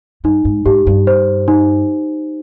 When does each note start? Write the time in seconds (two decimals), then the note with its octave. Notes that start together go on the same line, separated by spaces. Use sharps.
0.24 G2 D#4
0.45 G#2
0.66 G#2 G4
0.87 G2
1.07 C5
1.48 D#4